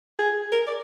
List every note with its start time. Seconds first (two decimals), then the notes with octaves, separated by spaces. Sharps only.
0.19 G#4
0.52 A#4
0.67 D5